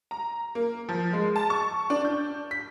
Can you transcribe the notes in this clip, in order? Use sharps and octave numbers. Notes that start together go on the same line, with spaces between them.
A#5
A#3
F3
G#3
A5
C#6
D4
G6
B6